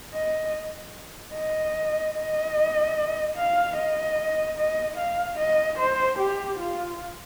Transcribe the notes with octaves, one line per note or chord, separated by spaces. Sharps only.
D#5
D#5
D#5
F5
D#5
D#5
F5
D#5
C5
G4
F4